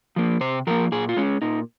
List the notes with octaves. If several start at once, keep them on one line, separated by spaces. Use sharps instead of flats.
F3 A#3
C3 C5
F3 A#3 A#4
A#2 G#4
F4
G#3 C#4
A#2 D#4